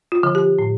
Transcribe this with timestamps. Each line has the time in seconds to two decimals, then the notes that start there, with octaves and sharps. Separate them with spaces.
0.12 F4
0.23 D3 F3
0.35 G4
0.59 A2